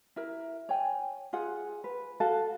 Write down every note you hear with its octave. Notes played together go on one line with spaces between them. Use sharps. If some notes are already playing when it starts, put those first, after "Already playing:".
E4 A#4
C#5 G5 G#5
F4 G#4 F#5
B4
F#4 A4 F5 A5